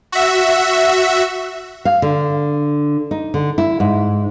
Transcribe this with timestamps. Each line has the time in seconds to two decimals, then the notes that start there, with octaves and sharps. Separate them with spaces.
0.12 F#4 E5
1.85 F5
2.02 D3
3.11 D#4
3.34 D3
3.58 E4
3.80 G#2